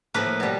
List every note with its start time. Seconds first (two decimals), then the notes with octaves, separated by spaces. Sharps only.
0.14 A2 F3 A#3 B4
0.40 B2 G3